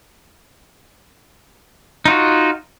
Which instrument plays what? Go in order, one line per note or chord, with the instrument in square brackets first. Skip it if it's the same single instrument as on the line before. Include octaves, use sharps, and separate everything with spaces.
[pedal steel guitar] D#4 F4 F#4